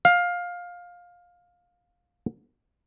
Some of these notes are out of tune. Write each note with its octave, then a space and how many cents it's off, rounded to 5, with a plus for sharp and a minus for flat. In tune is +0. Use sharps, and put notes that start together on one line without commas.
F5 +15